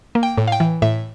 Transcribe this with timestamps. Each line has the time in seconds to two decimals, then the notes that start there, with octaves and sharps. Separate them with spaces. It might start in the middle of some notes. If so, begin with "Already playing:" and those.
0.15 A#3
0.23 G5
0.38 A2
0.48 F5
0.52 G5
0.60 E3
0.82 A2 E5